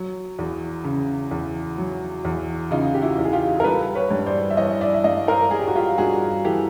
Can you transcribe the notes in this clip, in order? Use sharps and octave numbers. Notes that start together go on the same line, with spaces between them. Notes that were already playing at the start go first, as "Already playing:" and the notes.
Already playing: F#3
E2
C#3
E2
F#3
E2
C#3 D#4 F4
G4
E4 F#4
E2
G#4
F4 G4
A#4
G3 A4 B4
B4 C#5
G2
C5 D5
E5
E3 C#5 D#5
D5 E5
E5
G2 D#5 F5
A#4 C5
G3 G#4
G4
F#4
F4 G4
G2 F#4 G#4
E3 G4 A4